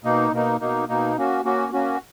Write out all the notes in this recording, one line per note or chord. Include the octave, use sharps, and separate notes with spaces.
B2 A#3 D#4
B2 A#3 D#4
B2 A#3 D#4
B2 A#3 D#4
A#3 C#4 F#4
A#3 C#4 F#4
A#3 C#4 F#4